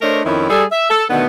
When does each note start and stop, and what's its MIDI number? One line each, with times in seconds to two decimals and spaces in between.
0.02 0.21 57
0.02 0.21 62
0.02 0.21 70
0.02 0.21 72
0.02 0.21 73
0.02 0.21 75
0.25 0.47 41
0.25 0.47 51
0.25 0.47 61
0.25 0.47 64
0.50 0.63 55
0.50 0.63 68
0.50 0.63 69
0.72 0.89 76
0.90 1.05 69
1.10 1.26 47
1.10 1.26 50
1.10 1.26 51
1.10 1.26 57
1.10 1.26 59